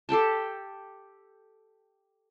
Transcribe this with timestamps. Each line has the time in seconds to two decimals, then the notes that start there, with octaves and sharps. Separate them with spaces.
0.09 G4 A4 G5 A5